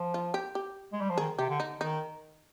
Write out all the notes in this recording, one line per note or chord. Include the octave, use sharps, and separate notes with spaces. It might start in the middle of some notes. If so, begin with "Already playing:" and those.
Already playing: F3
F4
G4
G4
G#3
G3
F3
D#3 G#4
C3 G4
D3
D#4
D#3 D#4